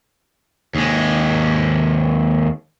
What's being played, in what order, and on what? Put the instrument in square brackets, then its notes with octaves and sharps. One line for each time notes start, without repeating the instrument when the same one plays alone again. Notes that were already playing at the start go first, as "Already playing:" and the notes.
[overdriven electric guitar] D#2 G#3